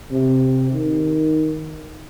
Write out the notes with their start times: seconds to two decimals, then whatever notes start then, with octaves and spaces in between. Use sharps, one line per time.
0.12 C3
0.73 D#3